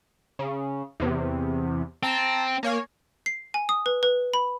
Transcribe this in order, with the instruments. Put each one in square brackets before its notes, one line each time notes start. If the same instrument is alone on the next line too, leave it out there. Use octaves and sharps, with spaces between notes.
[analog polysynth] C#3
E2 C3
[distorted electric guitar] C4 [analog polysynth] A5 A#5
[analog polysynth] A#3 C#5 G#5
[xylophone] C7
G#5
D#6
B4
B4
B5